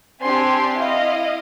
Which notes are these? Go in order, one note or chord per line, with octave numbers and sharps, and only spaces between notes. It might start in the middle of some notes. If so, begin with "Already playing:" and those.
C4 D4 G4 G#5 C6
E4 D#5 F5